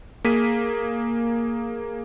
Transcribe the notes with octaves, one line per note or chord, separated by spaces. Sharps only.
A#3 G#4 B6 D#7